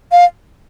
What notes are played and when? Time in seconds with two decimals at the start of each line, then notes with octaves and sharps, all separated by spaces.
0.12 F5